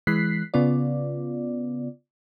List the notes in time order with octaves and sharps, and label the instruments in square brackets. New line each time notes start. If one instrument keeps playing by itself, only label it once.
[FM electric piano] E3 G#3 F#6 B6 C7
C#3 B3 F4 D5